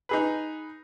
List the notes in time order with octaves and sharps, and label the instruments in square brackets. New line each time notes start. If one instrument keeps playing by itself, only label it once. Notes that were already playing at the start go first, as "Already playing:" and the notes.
[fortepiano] D#4 G#4 B4